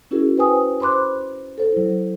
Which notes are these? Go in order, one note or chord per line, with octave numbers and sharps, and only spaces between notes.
C#4 E4 F#4 G#4 A#4
B4 C5 G5 G#5 D#6
C5 B5 C6 D6 F#6
A4 C5
F#3 E4